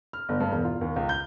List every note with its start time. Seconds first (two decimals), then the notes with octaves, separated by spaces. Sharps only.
0.13 F6
0.29 G1
0.40 G2
0.52 E1
0.64 F4
0.81 D#2
0.96 C#2
1.09 G6